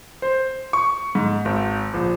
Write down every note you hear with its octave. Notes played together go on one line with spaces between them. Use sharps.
C5
C#6
G#2
G#1
A#1